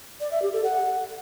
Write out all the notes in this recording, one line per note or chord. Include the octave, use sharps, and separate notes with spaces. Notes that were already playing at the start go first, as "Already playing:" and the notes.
D5
E5
G4
A4
F#5